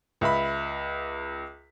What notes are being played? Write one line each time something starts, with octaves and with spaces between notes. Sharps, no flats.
C#2 E5 B5